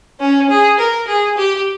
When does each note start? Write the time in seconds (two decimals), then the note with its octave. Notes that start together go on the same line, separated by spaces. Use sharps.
0.20 C#4
0.50 G#4
0.79 A#4
1.07 G#4
1.37 G4